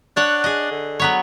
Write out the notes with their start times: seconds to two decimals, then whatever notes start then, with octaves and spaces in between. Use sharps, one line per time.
0.17 D4 C#5 F#5
0.44 G#4 D#5
0.71 D3
1.00 F#3 B3 C#5